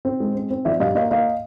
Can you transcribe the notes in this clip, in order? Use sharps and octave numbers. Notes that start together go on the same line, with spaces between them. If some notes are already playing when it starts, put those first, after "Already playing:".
C4
G#3
C4
C4
F3 D5 E5
G2 D#5 F5
A#3 D#5 F5
A#3 D#5 F5